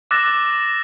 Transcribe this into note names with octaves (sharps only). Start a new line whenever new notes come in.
D6 E6 F#6 A6 A#6 E7